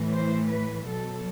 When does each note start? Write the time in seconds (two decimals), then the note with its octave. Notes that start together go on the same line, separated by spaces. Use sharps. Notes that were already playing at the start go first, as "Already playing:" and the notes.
Already playing: A2 E3
0.14 C5
0.51 B4
0.88 B2 F#3 A4